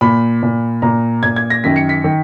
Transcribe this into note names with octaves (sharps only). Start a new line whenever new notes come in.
A#2 B5
A#2
A#2 A#5
A#2 G#6
G#6
A#6
F#2 D#3 B6
C#7
B6
D#3